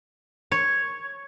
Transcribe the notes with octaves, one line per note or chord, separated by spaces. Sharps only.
C#5